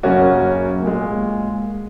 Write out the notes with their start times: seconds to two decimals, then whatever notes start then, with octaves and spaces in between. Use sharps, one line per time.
0.03 F#2 C#3 A#3 C#4 F#4
0.83 A#2 G#3